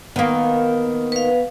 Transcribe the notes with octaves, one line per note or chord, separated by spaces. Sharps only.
D#3 A#3 B3
B4 F5